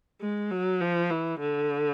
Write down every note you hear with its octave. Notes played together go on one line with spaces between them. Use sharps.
G#3
F#3
F3
E3
D3